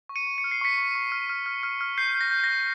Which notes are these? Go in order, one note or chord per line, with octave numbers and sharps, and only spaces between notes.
C#6
C#7 D#7
C#6
C#7
F6
C7
C#6 B6 C#7
C#6
C#6
F6
F6
F6
F6
F6
G6 C7
G6
A#6
G6
A#6
G6